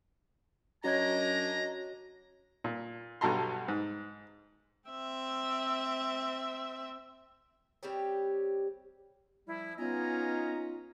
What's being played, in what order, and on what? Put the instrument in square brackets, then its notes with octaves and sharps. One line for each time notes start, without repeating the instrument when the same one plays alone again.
[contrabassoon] F#2 [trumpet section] D4 G#5 A#5 [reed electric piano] F#4 C#5 G#6 [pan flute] D#5
[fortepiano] A#2
B1 G2 B2 A4 A#5 C6
G#2
[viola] C4 E5
[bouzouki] G3 C4 G4 C#5
[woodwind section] F3 G3 E4
[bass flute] B3 [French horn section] C#4 D#4 [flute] F4 [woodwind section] D#5 G#5 A#5